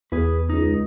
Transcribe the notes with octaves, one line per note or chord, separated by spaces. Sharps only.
E2 G#4 B4
C#2 D#4